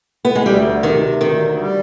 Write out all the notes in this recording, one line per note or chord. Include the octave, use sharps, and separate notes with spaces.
B3
G#3
D2 G3
C3 D#3
D2 D#3
G3